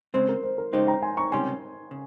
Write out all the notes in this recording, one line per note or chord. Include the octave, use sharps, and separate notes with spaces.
C#3 G#3 C4 C5
A#4
C5
A#4
C#3 G#3 D#4 G4 C5
G5 A#5
G#5 C6
A#5 C#6
C#2 C3 G3 C#4 G4 G#5 C6
C#3